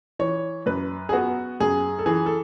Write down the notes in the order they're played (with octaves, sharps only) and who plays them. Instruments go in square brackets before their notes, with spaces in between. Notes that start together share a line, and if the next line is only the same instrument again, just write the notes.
[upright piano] E3 C#5
F#2 B4
G#4
B3 F#4
F#2 G#4
A4
E3 G#4
A4